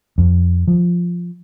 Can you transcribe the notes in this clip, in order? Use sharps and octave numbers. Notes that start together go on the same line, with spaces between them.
F2
F3